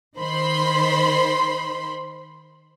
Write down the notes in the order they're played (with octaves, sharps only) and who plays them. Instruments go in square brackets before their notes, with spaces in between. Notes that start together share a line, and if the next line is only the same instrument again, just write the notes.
[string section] D#3 C5 B5 C6